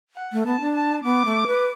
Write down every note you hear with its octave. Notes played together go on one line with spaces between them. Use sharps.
F#5
A3
B3 A5
D4
A5
B3 D6
A3
B4